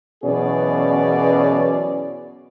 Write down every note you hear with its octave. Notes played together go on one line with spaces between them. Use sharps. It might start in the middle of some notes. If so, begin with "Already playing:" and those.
F#2 B2 E3 C#4 G#4 D5